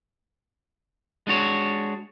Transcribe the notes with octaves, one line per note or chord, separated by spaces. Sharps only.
G#3 D4 F#4 C#5